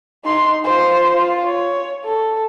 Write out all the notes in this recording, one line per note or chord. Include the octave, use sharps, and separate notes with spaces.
D#4 C6
F4 C5
F4
C#5
A4